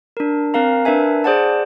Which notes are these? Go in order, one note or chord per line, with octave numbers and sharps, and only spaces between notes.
D4 A#4
C4 A#4 F5 A#5
D4 A#4 B4 E5 G#5
G#4 C5 D5 F#5 A5